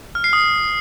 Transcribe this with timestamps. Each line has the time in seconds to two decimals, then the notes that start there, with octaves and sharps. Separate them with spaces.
0.15 F6
0.24 C7
0.33 D#6